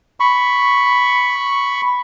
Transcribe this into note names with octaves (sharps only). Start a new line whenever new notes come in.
B5 C#6